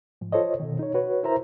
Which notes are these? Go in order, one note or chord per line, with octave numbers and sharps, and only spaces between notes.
G#2 F3
F4 A4 C5 C#5 D#5
B2 D#3
D#4 C#5
F#4 B4 C#5
E4 A#4 C5 E5 A#5